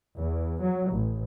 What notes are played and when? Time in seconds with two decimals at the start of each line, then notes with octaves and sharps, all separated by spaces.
0.17 E2
0.62 F#3
0.92 A1